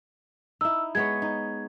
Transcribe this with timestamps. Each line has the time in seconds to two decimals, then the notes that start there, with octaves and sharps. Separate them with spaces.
0.61 D#4 E4 E6
0.95 G#3 B3 C#5 G#6
1.22 D#4